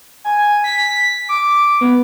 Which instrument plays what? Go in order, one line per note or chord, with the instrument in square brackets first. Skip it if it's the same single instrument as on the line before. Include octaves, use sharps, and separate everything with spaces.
[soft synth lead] G#5
B6
D6
B3